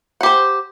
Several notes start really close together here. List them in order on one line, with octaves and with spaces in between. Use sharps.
F#5 G4 C5